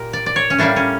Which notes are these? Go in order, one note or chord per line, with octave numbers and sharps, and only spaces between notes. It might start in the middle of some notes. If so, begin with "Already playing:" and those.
Already playing: A#2 G4 A#4
D5
D5
C#5
C#4
A2 G3 A#3 D4
C#4